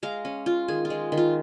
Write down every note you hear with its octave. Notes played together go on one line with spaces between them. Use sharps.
G#3 F5 A#5
C#4
F4
D#3 G#4
F4
G#3
D#3
F4